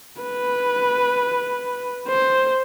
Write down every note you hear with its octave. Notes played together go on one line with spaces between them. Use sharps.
B4
C5